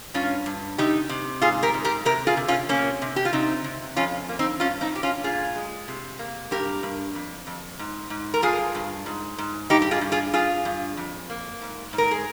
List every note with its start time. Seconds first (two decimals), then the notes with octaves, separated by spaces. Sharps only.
0.14 G2 C#4 F4
0.46 G2
0.78 C3 D#4 G4
1.09 C3
1.42 G#2 F4 G#4
1.63 G4 A#4
1.74 G#2
1.85 G4 A#4
2.05 C3 G4 A#4
2.27 F4 G#4
2.37 C3
2.48 C#4 F4
2.69 C3 A#3 C#4
3.02 C3
3.16 G4
3.25 F4
3.33 C3 C4 D#4
3.64 C3
3.96 F2 C#4 F4
4.29 A#3
4.39 C4 D#4
4.60 G2 C#4 F4
4.81 C4 D#4
4.92 G2 G4
5.03 C#4 F4
5.24 A#2 F4 G#4
5.56 G#3
5.88 C3
6.19 A#3
6.51 G2 G4 A#4
6.83 G2
7.15 F2
7.47 F2
7.79 G#2
8.10 G#2
8.34 A#4
8.42 G2 F4 G#4
8.75 G2
9.06 G#2
9.38 G#2
9.70 G2 D#4 G4
9.82 G4
9.91 F4 G#4
10.01 G2
10.12 F4 G#4
10.33 G2 F4 G#4
10.65 G2
10.97 F2
11.30 A#3
11.62 G#2
11.93 G#2
11.98 A#4
12.11 G#4